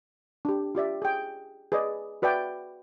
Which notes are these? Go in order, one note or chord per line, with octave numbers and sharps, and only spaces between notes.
D4 G4
F4 G4 D5 E5
G#4 G5
G#4 B4 D5 D#5
F#4 B4 D5 E5 G5